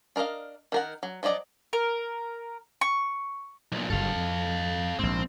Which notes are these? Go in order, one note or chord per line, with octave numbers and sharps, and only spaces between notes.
D4 A#4 D5 D#5 F5
D#3 A#4 F#5
F#3
F3 F#3 F4 D5 D#5
A#4
C#6
B1 A#2
F#1 G2 A4 F5
F2
A#1 G#2 C4